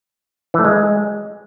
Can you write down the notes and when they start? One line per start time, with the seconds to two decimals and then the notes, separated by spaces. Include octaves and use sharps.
0.54 E3
0.59 A3
0.65 G#3